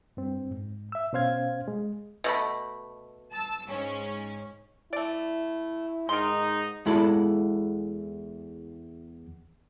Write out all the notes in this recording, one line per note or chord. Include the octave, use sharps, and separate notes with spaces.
G2 C4
G#2
E5 E6
B2 C#4 C5 F5 G#6
G#3
B2 A3 B5
A5 E6
G#2 C#4
A3 E4 D5
G#2 D#3 D#4 C6
E2 G#3 E4 F#4 A4 B5